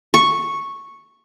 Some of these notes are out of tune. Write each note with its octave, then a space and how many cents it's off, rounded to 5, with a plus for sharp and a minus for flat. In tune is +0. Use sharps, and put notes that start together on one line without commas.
C#6 -5